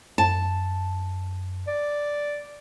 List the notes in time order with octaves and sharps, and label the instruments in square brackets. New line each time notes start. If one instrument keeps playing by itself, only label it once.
[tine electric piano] F#2 [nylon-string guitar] A5
[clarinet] D5